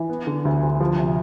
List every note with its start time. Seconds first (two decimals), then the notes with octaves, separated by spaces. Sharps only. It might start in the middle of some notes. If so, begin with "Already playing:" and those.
Already playing: E3
0.09 B3
0.27 D3
0.45 D2
0.63 D2
0.80 F3
0.99 C3